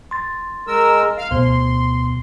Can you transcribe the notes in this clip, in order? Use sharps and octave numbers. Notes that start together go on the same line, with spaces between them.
C6 A6
G#3 A#4 E6
F5 F6
D2 B2 B3 C6